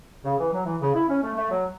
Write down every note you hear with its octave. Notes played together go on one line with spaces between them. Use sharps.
C#3
E3
F#3
E3
C#3
E4
C#4
A3
A3
F#3